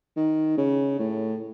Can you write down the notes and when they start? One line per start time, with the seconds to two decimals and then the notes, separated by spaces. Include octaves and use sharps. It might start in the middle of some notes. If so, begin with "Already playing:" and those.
0.16 D#3
0.57 C#3
0.99 A2